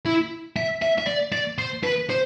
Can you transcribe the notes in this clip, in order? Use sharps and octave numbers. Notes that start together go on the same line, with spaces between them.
E4
E5
E5
E5
D5
D5
C5
B4
C5